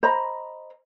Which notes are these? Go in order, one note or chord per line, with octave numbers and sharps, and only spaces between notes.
C5 D#5 A#5 B5